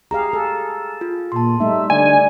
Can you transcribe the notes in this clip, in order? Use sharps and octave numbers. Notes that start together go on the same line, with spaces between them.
G4 G#4 F5 A#5
A4
F4
A#2 A5 C6
G3 A3 D#4 E5
D3 D5 G#5